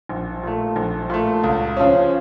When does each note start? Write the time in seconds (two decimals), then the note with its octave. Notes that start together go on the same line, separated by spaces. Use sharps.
0.09 A#1
0.43 A#2 A3
0.76 A#1
1.10 A#2 A3
1.44 C#2
1.76 C#3 F3 C#4